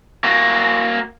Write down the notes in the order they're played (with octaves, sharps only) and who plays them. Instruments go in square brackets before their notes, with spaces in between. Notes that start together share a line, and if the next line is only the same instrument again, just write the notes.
[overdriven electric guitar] A#3 F#4